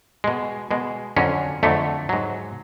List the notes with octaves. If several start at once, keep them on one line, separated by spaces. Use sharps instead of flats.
B2 G#3
B2 G#3
F2 D3 F#3 C#4
F2 D3 F#3 A3
G#2 F#3